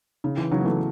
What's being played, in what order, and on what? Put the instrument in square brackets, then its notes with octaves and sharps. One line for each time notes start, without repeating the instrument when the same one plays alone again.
[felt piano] C#3
E3
C#3 F#3
B3
E3 A3